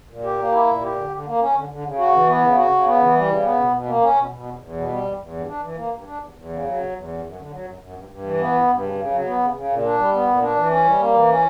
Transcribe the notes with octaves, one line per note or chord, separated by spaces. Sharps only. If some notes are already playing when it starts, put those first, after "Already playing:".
A#2
G4
A#3
E4
A#2
G4
D3
D3
A#3
C#4
D3
D3
C#3
F#4
E3
B3
C#3
F#4
C#3
B3
E3
G3
C#3
B3
B2
B2
A#3
C#4
B2
B2
E2
E2
B2
G3
E2
E2
G2
D4
E3
A#3
G2
D4
E2
E2
C#3
F#3
E2
E2
F#2
F#2
D3
F#3
F#2
F#2
G2
G2
E3
B3
G2
G2
C#3
C#3
F#3
B3
C#3
C#3
A#2
D4
G3
B3
A#2
D4
E3
C#4
G3
A#3
E3
C#4